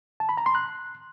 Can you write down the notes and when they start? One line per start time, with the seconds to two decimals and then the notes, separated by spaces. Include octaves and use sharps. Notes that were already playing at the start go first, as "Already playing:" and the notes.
0.20 A5
0.29 B5
0.37 A#5
0.46 C6
0.55 F#6